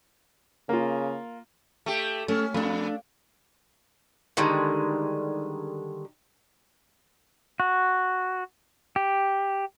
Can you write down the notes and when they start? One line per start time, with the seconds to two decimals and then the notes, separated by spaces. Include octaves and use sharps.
0.69 C#3 A#3 F4
1.86 A3 G4
2.28 A3 C#4
2.54 F2 A3 D4
4.37 D3 D#3 G3 G#3
7.60 F#4
8.96 G4